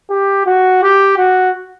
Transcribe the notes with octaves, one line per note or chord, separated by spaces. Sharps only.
G4
F#4
G4
F#4